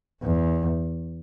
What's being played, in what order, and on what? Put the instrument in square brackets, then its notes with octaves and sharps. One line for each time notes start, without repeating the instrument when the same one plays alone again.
[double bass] E2